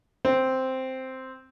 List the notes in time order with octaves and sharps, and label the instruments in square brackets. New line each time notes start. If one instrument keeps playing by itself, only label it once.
[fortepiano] C4